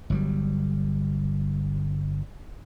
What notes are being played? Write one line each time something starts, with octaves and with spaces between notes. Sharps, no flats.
G1 F#3 G3